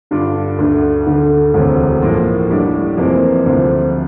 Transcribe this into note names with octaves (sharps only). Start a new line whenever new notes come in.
G2 D3 G3 D4 F4
D2 D3 A3
D2 D3 A3
E1 D2 C3
A2 F3 A#3 F4
A1 A2 G3 D4
F2 C3 E3 A#3
D2 C3 F3